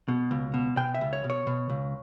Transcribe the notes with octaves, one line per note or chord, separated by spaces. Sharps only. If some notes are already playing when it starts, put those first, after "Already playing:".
B2
C#2
B2
B2 G5
E5
C#2
C#5
B2
C#5
B2
C#2